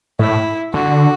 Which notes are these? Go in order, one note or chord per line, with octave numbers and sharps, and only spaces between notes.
A2 E4
D3 F#4